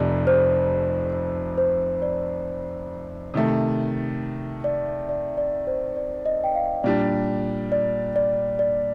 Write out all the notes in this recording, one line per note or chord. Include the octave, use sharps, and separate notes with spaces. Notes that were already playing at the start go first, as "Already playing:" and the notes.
Already playing: F1 F2 C3 D5
C5
C5
D5
C3 D#3 A3
D5
D5
D5
C5
D5
D#5
G5
F5
A#2 G3 D4 D5
D5
D5
D5